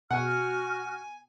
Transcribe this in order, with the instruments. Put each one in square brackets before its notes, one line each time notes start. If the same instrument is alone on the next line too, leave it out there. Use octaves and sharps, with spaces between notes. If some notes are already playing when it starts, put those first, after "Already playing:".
[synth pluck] B2 [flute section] F#4 F6 [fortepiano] F#5 [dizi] G#5